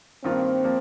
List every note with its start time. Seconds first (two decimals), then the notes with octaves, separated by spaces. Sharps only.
0.24 G2 D#3 A#3 C4 F4
0.64 F3 A#3